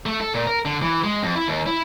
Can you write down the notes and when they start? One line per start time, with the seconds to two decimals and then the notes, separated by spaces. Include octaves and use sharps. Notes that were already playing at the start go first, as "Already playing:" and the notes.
0.06 A3
0.21 A4
0.34 A#2
0.47 A#4
0.65 D3
0.82 E3
1.04 G#3
1.23 F2
1.36 E4
1.48 D#2
1.66 E4